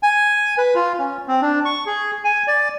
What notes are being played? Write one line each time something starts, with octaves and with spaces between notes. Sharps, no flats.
G#5
B4
F4
C#4
C4
D4
C#6
G#4
G#5
D5